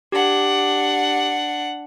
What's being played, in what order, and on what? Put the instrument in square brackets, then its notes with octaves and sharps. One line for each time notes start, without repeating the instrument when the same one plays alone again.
[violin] D4 F#5 [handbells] G4